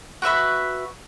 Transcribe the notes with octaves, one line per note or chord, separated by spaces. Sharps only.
F#4 B4 E5 B5